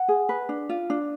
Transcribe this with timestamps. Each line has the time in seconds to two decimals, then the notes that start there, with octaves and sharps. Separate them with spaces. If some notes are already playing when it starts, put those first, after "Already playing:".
Already playing: F#5
0.08 G#4
0.29 B4
0.49 D4
0.69 F4
0.90 D4